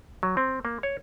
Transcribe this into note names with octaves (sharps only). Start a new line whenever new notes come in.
F#3
C4
A#3
C#5